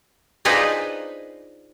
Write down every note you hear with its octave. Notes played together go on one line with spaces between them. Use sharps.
D4 D#4 F4 G#4 B4 C5